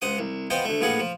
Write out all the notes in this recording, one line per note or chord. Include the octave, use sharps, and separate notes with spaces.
C#2 C5 F#5 D#6
C2
B3 F4 C5 D#5 G5
D2 A3
A#1 A2 F4 G#4 B4 F#5
F3